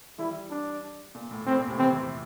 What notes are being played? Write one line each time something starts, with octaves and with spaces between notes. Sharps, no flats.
E3 G3 E4
D4
A#2
A2
A2 C4
A#2
A2 C3
C3 E3 C4
C3 E3